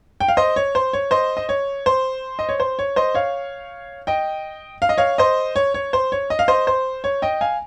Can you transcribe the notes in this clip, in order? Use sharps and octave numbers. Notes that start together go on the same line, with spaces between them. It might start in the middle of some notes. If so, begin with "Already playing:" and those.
G5
F5
C5 D#5
C#5
C5
C#5
C5 D#5
D#5
C#5
C5
D#5
C#5
C5
C#5
C5 D#5
C#5 F5
D#5 G5
F5
D#5
C#5 F5
C5 D#5
C#5
C#5
C5
C#5
D#5
F5
C5 D#5
C5
C#5
D#5 G5
F5 G#5